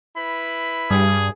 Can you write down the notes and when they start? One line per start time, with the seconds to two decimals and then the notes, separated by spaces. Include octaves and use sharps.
0.16 E4 B4 B5
0.90 G2 G3 G#4